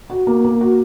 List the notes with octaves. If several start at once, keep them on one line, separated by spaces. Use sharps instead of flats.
F#4
A#3
A#3
F#4